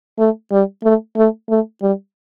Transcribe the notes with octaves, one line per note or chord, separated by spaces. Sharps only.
A3
G3
A3
A3
A3
G3